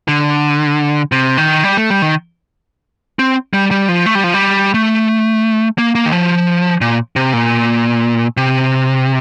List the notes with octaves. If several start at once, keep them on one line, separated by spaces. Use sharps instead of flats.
D3
C3
D#3
G3
A3
G3
D#3
C4
G3
G3
F3
A3
G3
F3
G3
A3
A#3
A#3
D#3
F3
A#2
C3
A#2
C3